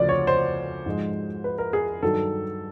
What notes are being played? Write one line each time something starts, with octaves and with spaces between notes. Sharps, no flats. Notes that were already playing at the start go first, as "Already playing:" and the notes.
Already playing: D2 C#3 F3 D5
C#5
C5
G#2 F3 G#3
B4
A#4
G#4
G2 D#3 F#3 A4